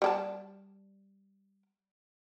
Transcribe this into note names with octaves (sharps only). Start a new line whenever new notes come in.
G3 G4 A5